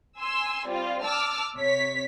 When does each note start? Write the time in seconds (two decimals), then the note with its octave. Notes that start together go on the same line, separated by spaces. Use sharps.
0.20 G#5 C6 E6
0.66 G3 C4 F4
1.04 A5 D6 E6 F6
1.57 C3 C#5 B6